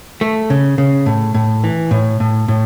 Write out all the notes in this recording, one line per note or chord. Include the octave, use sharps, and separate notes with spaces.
A3
C#3
C#3
A2
A2
E3
A2
A2
A2